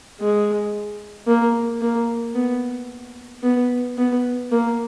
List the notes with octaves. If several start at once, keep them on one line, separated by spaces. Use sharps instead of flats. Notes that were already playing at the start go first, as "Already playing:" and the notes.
G#3
A#3
A#3
B3
B3
B3
A#3